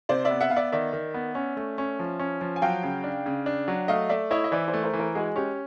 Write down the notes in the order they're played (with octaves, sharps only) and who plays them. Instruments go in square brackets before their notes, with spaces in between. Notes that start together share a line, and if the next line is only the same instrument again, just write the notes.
[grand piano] C3 [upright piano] C5 D5
[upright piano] D5 E5
[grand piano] B3
[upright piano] E5 F#5
[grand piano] B3 [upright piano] F5
[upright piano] D5 E5
[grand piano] D#3 [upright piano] D5 E5
[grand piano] D#3
B3
C#4
A3
C#4
F3
C#4
F3
[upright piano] G#5
[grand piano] F#3 [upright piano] F5 G5
[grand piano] C#3
D4
C#3
D4
F#3
[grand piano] A3 [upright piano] D#5 F5
[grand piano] A3 [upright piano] D5 E5
[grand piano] E4 [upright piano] C#5 D#5
[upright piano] D#5
[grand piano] E3 [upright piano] C5 D5
[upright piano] C5 D5
[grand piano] A3
[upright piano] A#4 C5
[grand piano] E3
[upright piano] A#4 C5
[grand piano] G#3 [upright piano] F#4 G#4
[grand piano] C#4 [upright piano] G4